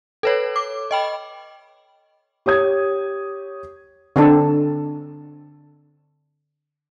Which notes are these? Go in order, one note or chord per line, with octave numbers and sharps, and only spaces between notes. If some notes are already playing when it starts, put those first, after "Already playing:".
A4 B4 C#5
D6
D#5 G5 B5
G4 C#5 D#6 G#6
D3 C4 D4 D#4 A4 C5